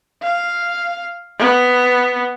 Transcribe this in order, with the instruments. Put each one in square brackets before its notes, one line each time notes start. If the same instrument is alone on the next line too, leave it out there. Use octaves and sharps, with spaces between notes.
[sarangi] F5
B3